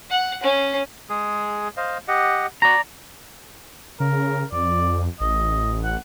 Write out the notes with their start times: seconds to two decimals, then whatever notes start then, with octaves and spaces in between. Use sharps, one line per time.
0.11 F#5
0.43 C#4
1.10 G#3 G#4
1.77 C5 D#5 F5
2.08 G4 D#5 F#5
2.62 F#4 D5 A#5
4.00 C#3 A#4
4.52 F2 D5
5.20 A1 D#5
5.84 F#5